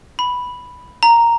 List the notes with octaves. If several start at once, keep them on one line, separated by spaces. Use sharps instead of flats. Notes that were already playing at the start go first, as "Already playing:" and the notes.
B5
A#5